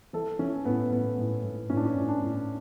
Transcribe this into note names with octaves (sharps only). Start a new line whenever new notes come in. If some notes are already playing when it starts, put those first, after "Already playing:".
E3 A4
E3 C#4
A2 B3
A2 B3
A2
A2
A2 C#4
D4
C#4
A2
D4
A2